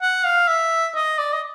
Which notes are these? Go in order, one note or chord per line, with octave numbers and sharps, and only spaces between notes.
F#5
F5
E5
D#5
D5
D#5